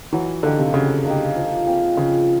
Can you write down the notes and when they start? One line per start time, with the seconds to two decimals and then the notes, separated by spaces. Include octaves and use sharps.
0.13 E3 F#3
0.43 D3 A#3 D#4 G4
0.59 C3
0.74 C#3 F#3
1.05 D3 A#3 D#4 G4
1.35 F3
1.66 G#3 C4 F4
1.97 C#3 F3